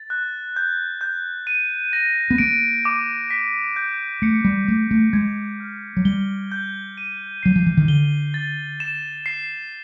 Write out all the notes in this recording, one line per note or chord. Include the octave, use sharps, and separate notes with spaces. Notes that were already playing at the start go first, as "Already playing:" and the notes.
Already playing: A6
F#6
G6
G6
D#7
A#6
B3
A#3 D7
D6
B6
G6
A3 C#7
G3
A3 D6
A3
G#3 G#6
F6
F#3
G3 G7
G6
D#7
F#3 C7
F3
E3
D#3
D3 G7
A6
E7
C7